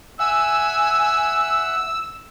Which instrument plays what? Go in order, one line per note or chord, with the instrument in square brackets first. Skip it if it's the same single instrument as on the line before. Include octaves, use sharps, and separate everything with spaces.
[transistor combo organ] E5 F#5 [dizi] G#5 [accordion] E6